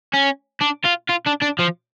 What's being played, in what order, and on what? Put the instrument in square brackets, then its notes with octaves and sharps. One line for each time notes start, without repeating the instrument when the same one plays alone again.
[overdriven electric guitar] C#4
D4
F4
F4
D4
D4
F3